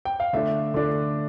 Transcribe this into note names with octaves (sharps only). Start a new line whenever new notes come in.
G5
F5
D3 A3 D4 E5
D3 A3 D4